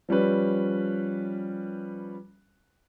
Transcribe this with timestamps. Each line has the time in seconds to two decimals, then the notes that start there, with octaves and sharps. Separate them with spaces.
0.09 F3 G3 C#4 B4